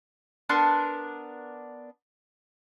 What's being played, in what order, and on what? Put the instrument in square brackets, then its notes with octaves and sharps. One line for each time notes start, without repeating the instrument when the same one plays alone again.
[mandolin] B3 D4 A#4 C6